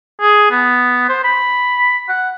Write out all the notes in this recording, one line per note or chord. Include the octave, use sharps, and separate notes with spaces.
G#4
B3
C5
B5
F#5